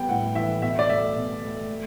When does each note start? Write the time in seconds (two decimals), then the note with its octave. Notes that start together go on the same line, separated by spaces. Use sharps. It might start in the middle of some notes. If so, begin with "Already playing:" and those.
Already playing: G3 B3 G5
0.09 A2 F#5
0.35 E3 E5
0.62 B2 E5
0.79 D5
0.89 A3 E5
1.16 B2
1.42 A3
1.69 A3